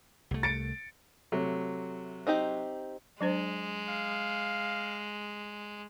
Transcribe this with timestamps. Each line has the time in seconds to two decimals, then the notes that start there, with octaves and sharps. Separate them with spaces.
0.31 C2 A3
0.43 A6 C#7 D7
1.32 C3 F#3 A3
2.27 C4 D#4 G4
3.21 F#3 G#3 D4 C5
3.88 F5